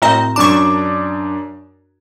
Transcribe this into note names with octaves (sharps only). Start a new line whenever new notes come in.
A2 C4 F#4 A#4 D#5 A#5
F#2 D4 A5 C#6 D6